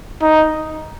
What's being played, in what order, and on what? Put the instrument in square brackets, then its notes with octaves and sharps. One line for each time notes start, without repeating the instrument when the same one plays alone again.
[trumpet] D#4